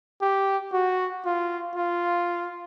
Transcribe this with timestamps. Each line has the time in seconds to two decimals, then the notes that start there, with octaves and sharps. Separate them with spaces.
0.22 G4
0.73 F#4
1.25 F4
1.76 F4